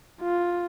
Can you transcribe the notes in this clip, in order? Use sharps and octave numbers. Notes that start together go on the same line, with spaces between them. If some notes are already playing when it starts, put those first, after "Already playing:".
F4